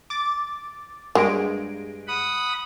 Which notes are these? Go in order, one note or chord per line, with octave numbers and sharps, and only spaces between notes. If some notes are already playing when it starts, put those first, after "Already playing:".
D6 A6
G2 F#3 G#3 A#3 D7
F#5 B5 D#6